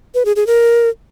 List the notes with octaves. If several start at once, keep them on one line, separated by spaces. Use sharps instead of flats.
B4
G#4
G#4
A#4